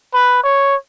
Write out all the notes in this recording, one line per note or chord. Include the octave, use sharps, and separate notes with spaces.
B4
C#5